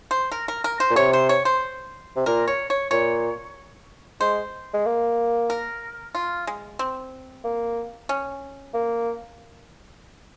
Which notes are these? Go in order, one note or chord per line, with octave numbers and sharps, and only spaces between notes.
C5
A#4
A#4
A#4
C5
A#2
C3 C#5
C5
C#5
C5
C3
A#2 A#4
C#5
C#5
A#2 C#5
G#3 C5
G#3
A#3
A#4
F4
G#3
C4
A#3
C#4
A#3